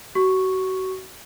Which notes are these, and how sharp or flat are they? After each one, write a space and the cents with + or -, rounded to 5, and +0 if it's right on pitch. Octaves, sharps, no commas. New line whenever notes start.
F#4 +30 C#6 +0